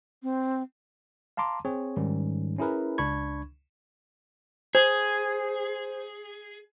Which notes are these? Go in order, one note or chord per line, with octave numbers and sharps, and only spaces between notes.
C4
F5 A5 A#5 C6 D6
C4 G#4 C#5
G#2 D#3 G3 C#4
C#4 E4 G#4 A#4 B4
C#2 D4 B5 C#6 G#6
G#4 C5